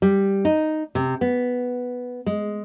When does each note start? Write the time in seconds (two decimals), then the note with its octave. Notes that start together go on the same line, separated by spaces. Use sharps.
0.02 G3
0.45 D#4
0.95 C3
1.21 B3
2.26 G#3